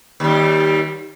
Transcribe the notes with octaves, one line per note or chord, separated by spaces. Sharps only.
D#2 G3